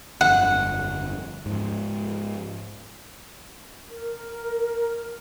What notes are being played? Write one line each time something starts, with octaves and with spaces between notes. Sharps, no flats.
G1 F2 D3 F#5
G#2 F3
A#4